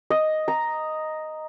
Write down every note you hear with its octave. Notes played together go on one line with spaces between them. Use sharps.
D#5
A#5